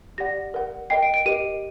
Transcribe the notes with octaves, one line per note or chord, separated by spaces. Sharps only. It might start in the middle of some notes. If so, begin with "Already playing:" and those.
G4 D5 F#5 A#6
A#4 F#5
A#4 D#5 G5 C7
D7
D7
G4 A#4 D#5 D#7